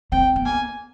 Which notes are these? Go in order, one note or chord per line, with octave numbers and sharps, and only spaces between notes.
C4 G5
B3
A#3 G#5